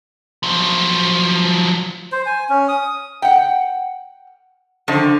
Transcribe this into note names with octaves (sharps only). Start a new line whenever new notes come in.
F3 F#3
C5
G#5
C#4
D#6
F#5 G5
D3 D#3 F3